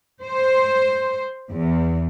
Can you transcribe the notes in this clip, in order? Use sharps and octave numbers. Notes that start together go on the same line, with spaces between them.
C5
E2